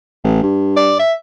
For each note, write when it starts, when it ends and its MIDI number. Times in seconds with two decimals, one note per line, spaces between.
0.24 0.38 33
0.42 0.99 43
0.77 0.97 74
1.00 1.13 76